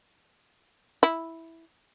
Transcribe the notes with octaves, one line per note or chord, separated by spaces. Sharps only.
E4